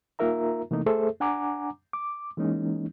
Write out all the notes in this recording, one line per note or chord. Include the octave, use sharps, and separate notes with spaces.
A#3 D#4 F4 A#4 E5 A#5
C3 E3 A3 A#3 D#4
A3 G#4 A4 C5 E5
D4 F#5 G#5 A#5 D6
D6
E3 G#3 A#3 C#4 D#4